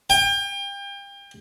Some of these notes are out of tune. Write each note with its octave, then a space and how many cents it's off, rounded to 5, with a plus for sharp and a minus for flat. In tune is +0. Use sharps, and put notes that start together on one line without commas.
G5 +35